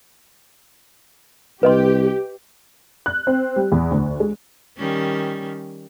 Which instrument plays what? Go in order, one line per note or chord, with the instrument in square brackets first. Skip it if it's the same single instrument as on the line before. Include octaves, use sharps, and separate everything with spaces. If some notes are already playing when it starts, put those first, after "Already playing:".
[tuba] C2 [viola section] G4 [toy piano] B4 D#5 C6
[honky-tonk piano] F#6
C4
G3
E2
D2
G#3
[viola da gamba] D#3 G3 C#4